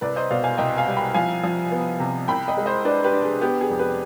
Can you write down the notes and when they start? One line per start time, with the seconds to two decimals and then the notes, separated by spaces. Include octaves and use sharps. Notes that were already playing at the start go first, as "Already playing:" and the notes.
0.01 C2 B4 D5
0.16 C5 D#5
0.31 B2 D5 F5
0.44 F5 G#5
0.58 C2 D#5 G5
0.77 F5 G#5
0.87 G3
0.97 G5 B5
1.14 F3 F5 G#5
1.43 F3
1.71 B3
2.00 C3
2.28 C2 G5 B5
2.48 D#5 G5
2.57 G#3
2.66 C5 D#5
2.85 D4 B4 D5
3.04 G4 B4
3.13 D4
3.23 G#4
3.41 B3 G4
3.61 G#4
3.70 F2
3.79 G4 B4